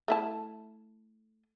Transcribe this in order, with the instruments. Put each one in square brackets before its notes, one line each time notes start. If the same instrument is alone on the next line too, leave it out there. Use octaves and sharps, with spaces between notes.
[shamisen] A3 E4 A5